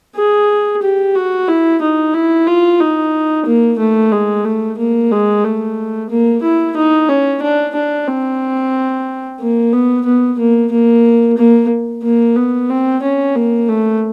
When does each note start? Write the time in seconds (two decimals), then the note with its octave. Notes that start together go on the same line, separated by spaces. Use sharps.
0.16 G#4
0.83 G4
1.15 F#4
1.48 E4
1.82 D#4
2.14 E4
2.47 F4
2.80 D#4
3.46 A#3
3.79 A3
4.12 G#3
4.45 A3
4.79 A#3
5.11 G#3
5.44 A3
6.10 A#3
6.43 E4
6.76 D#4
7.09 C#4
7.42 D4
7.75 D4
8.07 C4
9.40 A#3
9.73 B3
10.06 B3
10.39 A#3
10.72 A#3
11.38 A#3
12.04 A#3
12.36 B3
12.70 C4
13.03 C#4
13.36 A#3
13.69 A3